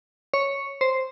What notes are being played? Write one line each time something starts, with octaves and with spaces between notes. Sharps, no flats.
C#5
C5